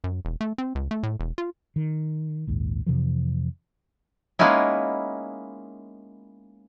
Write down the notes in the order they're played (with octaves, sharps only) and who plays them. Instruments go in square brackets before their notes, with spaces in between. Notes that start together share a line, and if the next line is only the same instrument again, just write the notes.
[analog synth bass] F#2
E1
A3
C4
C#2
A3
A2
E1
F4
[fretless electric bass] D#3
A#1 D#2 G#2
F2 C3 E3 F3
[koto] G#3 A#3 B3 C#4 D#4 E4